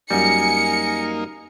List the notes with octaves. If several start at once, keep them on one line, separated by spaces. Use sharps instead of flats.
F#2 G3 A#3 D#4 G#5 C#7